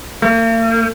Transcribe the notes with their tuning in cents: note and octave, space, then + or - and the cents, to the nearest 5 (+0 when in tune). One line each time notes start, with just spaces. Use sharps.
A#3 -45